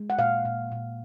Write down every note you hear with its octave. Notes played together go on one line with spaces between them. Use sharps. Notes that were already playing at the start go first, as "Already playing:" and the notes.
Already playing: G#3
F#5
A#2 F5
A#2
A#2